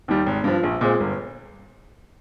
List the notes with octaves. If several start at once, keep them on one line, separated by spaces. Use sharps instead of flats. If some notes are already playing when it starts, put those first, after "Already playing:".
D#2 D#3 G3
G#1
G2 F3
A#1
A#2 G#3 C4
G1